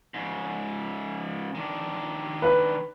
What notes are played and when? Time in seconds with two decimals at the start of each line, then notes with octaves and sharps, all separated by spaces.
0.14 G#2 C#3
1.55 D#3 D4
2.42 B4